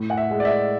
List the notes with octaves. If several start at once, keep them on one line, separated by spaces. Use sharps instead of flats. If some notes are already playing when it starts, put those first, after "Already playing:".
Already playing: A2
F#5
E5
G#3
D5
E5